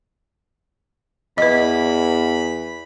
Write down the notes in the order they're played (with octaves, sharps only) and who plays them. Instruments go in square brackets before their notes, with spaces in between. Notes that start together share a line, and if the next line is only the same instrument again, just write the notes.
[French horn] E2 [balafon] B4 D#5 [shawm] B5